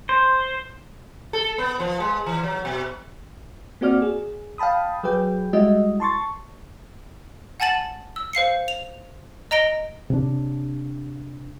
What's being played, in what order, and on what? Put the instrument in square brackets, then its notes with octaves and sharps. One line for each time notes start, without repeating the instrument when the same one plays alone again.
[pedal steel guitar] C5
[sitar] A4
B3
F3
G#3
E3
F#3
B2
[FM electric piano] A#3 C4 F#4 D5 F6
G#4
F5 G5 A5 B5 D#6
F#3 G#4 B4 G5
G3 G#3 E4 F#4 D#5 E5
A5 C6 C#6 A6
[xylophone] F#5 G#5 A5 A6 F#7
E6
C5 F5 C7 C#7
F7
D#5 A#5 A#6 D7 G7
[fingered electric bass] C3 D4